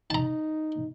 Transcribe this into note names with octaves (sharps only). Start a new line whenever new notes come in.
D#4 A5 A#5